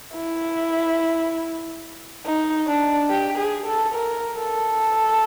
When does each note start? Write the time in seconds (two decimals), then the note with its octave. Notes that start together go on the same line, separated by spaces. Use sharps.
0.13 E4
2.25 D#4
2.68 D4
3.10 G4
3.38 G#4
3.66 A4
3.95 A#4
4.37 A4